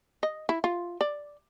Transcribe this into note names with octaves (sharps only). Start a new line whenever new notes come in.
D#5
E4
F4
D5